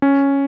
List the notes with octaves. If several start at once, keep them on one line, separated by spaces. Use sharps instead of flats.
C#4